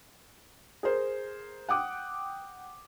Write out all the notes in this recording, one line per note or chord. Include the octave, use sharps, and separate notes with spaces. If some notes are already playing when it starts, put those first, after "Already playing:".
G#4 A#4 C5
F#5 G5 D6 D#6